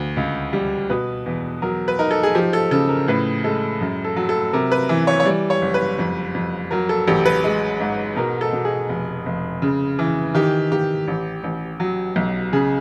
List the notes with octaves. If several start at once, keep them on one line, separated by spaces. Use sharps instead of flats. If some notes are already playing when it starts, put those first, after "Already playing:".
Already playing: D2
C#2
G3
B2 B4
E2
F#3 A#4
B4
D#4 A#4
A4
G#4
F3 G4
A4
C#3 A4
A#4
A2 B4
G#3 A4
F#2
A4
F#3
A4
C3 A#4
B4
E3
C#5
C#5
G3 D5
C#5
F#1
B4
F2
F2
F#3 A#4
A4
A1 G4
B4
G#3
G#2
B2 A#4
A4
B2
G#4
F1
F1
C#3
E3
D#3 G4
D#3 G4
A1
A1
F#3
B1
C#3 G#4